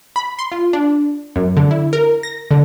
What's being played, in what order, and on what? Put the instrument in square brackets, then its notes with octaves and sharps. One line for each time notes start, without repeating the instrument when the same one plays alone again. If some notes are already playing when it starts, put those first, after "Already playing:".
[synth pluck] B5
C6
F4
D4
F#2
D3
E4
A#4
A#6
D3